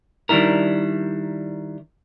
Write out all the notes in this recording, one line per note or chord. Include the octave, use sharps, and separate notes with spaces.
D#3 G3 D4 E4 A#4